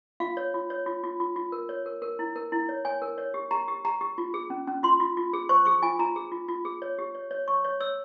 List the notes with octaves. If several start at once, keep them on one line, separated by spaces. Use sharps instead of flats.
F4 F5
C#5
F4
C#5
F4
F4
F4
F4
A#4
C#5
A#4
A#4
E4
A#4
E4
C#5
C#5 G#5
A#4
C#5
G4
G4 A#5
G4
G4 A#5
G4
F4
G#4
C#4
C#4
F4 C6
F4
F4
G#4
C5 C#6
G#4 C#6
F4 G#5
F4 A#5
G#4
F4
F4
G#4
C#5
G4
C#5
C#5
C#5 C#6
C#5
C#5 E6